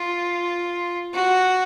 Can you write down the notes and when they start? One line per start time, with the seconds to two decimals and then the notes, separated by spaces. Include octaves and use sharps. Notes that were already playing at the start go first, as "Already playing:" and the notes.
Already playing: F4
1.14 F#4